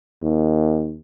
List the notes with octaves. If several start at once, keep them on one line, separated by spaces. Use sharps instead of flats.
D#2